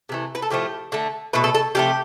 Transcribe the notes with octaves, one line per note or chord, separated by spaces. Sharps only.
C3 E3 A3
B4
A4
A2 F3 A3 G4
D3 A3
B2 A3 B4
A4
A4
C3 F3 A3 G4